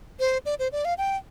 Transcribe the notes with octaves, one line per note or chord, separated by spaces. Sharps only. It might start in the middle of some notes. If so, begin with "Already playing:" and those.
C5
D5
C5
D5
F5
G5